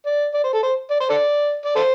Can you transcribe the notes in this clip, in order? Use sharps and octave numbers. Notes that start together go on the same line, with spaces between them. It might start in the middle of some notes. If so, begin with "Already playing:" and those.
D5
D5
C5
A4
C5
D5
C5
A4 D5
D5
A4 C5